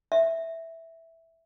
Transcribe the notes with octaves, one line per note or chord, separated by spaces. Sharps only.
E5